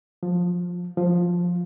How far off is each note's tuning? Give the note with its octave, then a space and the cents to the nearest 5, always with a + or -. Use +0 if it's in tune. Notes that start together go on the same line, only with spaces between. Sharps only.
F3 +20
F3 +10